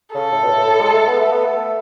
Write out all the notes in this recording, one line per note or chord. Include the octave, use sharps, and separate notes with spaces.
C#3 A4
A2
B2
A2
A2
G#3
A3
B3
A3
B3
A3